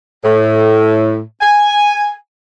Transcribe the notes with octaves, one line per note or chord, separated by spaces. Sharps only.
A2
G#5